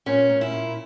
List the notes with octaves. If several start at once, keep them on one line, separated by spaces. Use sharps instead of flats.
A#2 C#4
A#2
E4
A#2